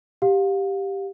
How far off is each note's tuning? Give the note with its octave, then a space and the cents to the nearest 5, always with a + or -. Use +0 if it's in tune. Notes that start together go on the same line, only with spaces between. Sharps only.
G4 +0 F5 +30